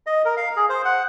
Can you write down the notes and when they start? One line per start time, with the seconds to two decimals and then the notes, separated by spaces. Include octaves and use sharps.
0.07 D#5
0.25 A#4
0.37 F5
0.56 G#4
0.70 C5
0.85 F#5